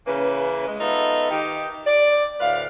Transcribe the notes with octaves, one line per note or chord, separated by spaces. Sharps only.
C#3 E3 A#3 C#4 B4
G#3
B3 D#4 F4 A4 B4 E5
D#3 D#4 G4
D5
D2 A2 B4 F5